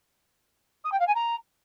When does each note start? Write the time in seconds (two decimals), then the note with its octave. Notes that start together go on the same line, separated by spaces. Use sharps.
0.84 D#6
0.92 G5
0.99 F5
1.07 G#5
1.15 A#5